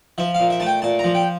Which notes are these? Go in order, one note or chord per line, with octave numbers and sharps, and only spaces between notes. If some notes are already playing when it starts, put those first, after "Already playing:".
F3 E5
F5
A#2
E5
A3 A5
G5
A#2 A5
A#5
F3
G5